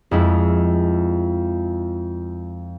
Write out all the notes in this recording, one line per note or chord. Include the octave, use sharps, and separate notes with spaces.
F2 G#3 E4